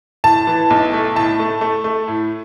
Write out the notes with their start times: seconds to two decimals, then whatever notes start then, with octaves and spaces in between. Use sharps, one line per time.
0.24 A2 A5
0.47 E3
0.70 B1
0.93 A3
1.16 A2 A5
1.39 A3
1.61 A3
1.84 A3
2.08 A2